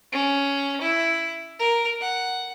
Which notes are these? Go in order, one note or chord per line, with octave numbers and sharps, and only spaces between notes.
C#4
E4
A#4
F#5